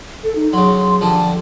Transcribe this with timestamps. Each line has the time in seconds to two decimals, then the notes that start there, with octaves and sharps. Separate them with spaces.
0.24 A4
0.36 D#4
0.53 C#3 F#3 C6
1.01 G2 D3 F3 A5